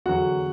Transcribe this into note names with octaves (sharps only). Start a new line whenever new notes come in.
E2 D3 F#3 F#4 F#5